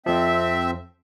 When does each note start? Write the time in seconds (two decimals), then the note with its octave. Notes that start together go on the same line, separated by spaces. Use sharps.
0.06 F2 F3 C4 E5